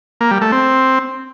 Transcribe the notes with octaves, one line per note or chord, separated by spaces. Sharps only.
A#3
G3
A3
C4